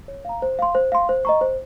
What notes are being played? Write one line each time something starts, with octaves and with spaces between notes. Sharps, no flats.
C#5
F5 A#5
C5
F5 C6
C5
F5 C6
C5
D#5 A#5 C#6
C5